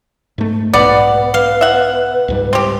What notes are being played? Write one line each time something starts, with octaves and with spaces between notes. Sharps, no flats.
G#2 A3
B1 G#2 B2 B3 B4 D5
F5
E5 F#5
C#2 G#2 G3
C4 G4